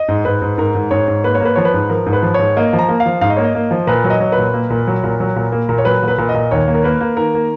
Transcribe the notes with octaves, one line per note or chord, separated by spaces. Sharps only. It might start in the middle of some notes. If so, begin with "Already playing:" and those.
Already playing: D#5
G#2
G#2 B4
G#2
G#2 A#4
G#2
G#2 C#5
G#2
A#3 B4
C#5
A#3
B4
F3 C#5
B4
G#2
F3 A#4
G#2
B4
F3
G#2 C#5
A#3 D#5
F3
A#5
A#3
F5
F3
G#2 F5
D#5
A#3 C#5
D#5
A#3
F3
A#2 B4
F#3
D#5
F#3
B4
A#2
A#3
A#2
F#3
A#2
F#3
A#2
A#3
A#2
C#5
F#3 B4
A#2
B4
A#2
D#5
A#2
D#2 C#5
A#3
A#4
A#3 B4
A#3
D#3 A#4
A#3